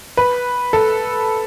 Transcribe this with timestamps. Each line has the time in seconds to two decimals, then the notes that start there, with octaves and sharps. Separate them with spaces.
0.17 B4
0.73 A4